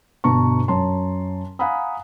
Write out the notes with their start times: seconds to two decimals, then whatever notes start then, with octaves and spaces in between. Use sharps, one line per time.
0.24 G1 B2 D4 A5 A#5 C#6
0.68 F#2 C#5 A5 A#5 C6
1.59 F5 F#5 G#5 A#5 B5 D#6